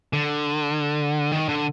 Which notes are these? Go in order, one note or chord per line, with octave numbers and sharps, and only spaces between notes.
D3
D#3
D3